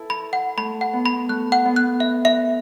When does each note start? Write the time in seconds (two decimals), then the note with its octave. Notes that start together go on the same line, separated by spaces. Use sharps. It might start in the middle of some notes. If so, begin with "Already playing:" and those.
Already playing: E4 A4 B4
0.10 B5
0.33 F#5
0.57 A3 B5
0.81 F#5
0.93 B3
1.06 B5
1.29 A3 F#6
1.52 F#5
1.65 B3
1.76 F#6
2.00 E5
2.25 E5